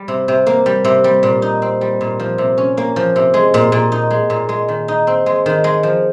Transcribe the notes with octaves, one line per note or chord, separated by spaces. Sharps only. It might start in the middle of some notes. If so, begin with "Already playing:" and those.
Already playing: G3
C3
C3
A#3
G3
C3
G3
A#2
D#4
C4
G3
A#2
F3
C3
C#4
A#3
F3
C3
G#3
A#2
A#2
D#4
G#3
A#2
G#3
D#3
D#4
C4
G#3
D#3
G#3
F3